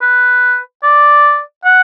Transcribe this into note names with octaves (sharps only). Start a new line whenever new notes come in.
B4
D5
F#5